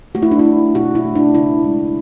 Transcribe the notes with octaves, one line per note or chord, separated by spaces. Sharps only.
A3 F#4
E4
D4
E4
A3
B2 F#4
E4
A3
D4
C#3 E4
G#3